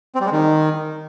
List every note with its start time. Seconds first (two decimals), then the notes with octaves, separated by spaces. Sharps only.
0.15 C4
0.20 G3
0.26 G#3
0.32 D#3